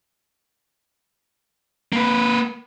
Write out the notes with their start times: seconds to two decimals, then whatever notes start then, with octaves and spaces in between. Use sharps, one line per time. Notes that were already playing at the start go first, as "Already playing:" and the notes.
1.93 A#3 B4